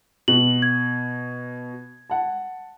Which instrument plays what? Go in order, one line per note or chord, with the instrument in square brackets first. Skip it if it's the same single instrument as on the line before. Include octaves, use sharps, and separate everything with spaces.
[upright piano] B2 [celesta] F#7
[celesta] G#6
[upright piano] F#5 A5